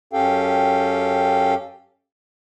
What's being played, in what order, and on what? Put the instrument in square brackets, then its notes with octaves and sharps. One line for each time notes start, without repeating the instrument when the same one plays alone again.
[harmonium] F#2 C#4 G4 A4 F5 G5